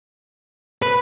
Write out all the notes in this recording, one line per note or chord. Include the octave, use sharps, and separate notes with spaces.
B4